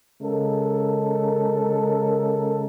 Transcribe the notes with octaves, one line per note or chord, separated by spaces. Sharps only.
C#3 G#3 A4 A#4